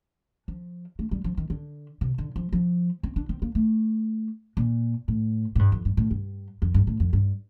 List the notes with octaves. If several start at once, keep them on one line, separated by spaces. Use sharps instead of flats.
F3
A3
G3
F3
D#3
D3
C3
D3
F3
F3
C4
D4
C4
A#3
A3
A#2
A2
A2
G2
F2
G2
A2
G2
F2
G2
A2
F2
G2